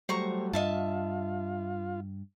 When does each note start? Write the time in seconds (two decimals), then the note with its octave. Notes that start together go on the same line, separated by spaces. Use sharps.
0.09 F#3 G3 A3 C5 A#5 C#6
0.53 G2 F4 D#5 E5 A5